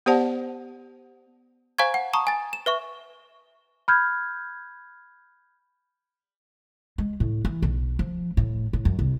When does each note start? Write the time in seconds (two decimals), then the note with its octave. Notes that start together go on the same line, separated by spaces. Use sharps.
0.06 B3 G4 C5 D5 F#5 A5
1.78 C5 F5 G#5 A#5 C#6 G#6
1.94 F#5
2.13 A5 A#5 C#6 D#6
2.27 G#5 A6
2.53 E7
2.66 B4 E5 C#6
3.88 B5 F6 G6 G#6
6.98 G#3
7.20 A2
7.45 E3
7.62 B1
7.99 F3
8.37 A2
8.73 A2
8.85 F#2
8.99 C2